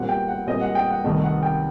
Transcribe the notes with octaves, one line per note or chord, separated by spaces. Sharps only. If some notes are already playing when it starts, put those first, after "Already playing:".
Already playing: A#2 G3 C4 F#5
G5
F#5
A#2 G3 C4 D#5
F#5
G5
F#5
C2 C3 D#3 A3 D#5
F#5
G5